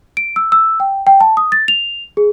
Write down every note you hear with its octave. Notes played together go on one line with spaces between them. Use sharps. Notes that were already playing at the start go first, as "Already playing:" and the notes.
D7
E6
E6
G5
G5
A5
D#6
A6
F7
G#4